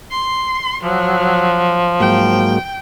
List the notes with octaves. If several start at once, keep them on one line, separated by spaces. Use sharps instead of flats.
C6
F3 F#3
G#2 F#3 A#3 G5